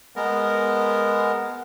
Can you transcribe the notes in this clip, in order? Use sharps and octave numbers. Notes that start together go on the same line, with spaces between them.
G#3 B3 A#4